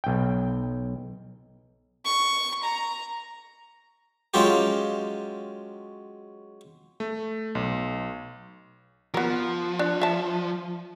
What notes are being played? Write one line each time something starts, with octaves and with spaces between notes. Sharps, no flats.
B1 G5
C#6
A#5
F#3 G#3 C#4 F4 G4
A3
B1
F3 B3 A#4
D4
E5 A5